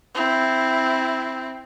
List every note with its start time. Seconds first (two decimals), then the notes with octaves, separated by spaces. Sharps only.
0.15 C4 E4